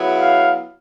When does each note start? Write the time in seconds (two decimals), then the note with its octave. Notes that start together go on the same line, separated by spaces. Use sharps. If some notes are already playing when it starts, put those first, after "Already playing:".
Already playing: C#3 F#3 B3 E4
0.19 F5